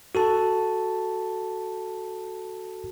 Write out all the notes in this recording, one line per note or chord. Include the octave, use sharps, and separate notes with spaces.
F#4 A4 A5